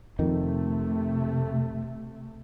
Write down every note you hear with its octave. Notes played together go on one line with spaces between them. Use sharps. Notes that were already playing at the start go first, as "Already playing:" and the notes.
F2 C3 D#3 A3